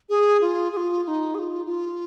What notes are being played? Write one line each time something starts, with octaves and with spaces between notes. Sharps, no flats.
G#4
F4
G#4
F4
F4
D#4
G#4
F4
F4